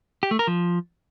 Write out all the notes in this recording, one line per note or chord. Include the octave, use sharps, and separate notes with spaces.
G4
A3
A#4
F3